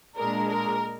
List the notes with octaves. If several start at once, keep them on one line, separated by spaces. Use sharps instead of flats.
A#2 G#3 D4 A#4
A#4